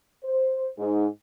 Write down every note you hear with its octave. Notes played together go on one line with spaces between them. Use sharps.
C5
G#2